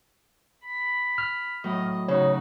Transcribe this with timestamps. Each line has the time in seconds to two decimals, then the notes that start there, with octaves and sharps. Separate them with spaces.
0.64 B5
1.18 F6
1.64 A2 F#3 D#5
2.08 C#3 D#4 F#4 C#5